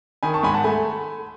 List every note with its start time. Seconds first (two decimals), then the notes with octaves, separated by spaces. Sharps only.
0.23 D#3 G#5 B5
0.34 A5 C#6
0.43 G#2 G#5 B5
0.54 F#5 A5
0.64 A3 G#5 B5